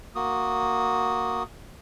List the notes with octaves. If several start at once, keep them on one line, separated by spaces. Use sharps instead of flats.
A#3 F#4 D#6